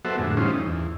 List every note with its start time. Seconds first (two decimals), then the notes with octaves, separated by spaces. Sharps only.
0.05 F#3 B3 F#4 A4 C5 E5
0.18 F2 A2 D3 G#3
0.37 E3 G3 C#4 D#4 F4 C5
0.53 D#4
0.66 E2